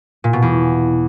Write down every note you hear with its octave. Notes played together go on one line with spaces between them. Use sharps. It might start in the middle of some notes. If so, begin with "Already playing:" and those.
A#2
B2
E2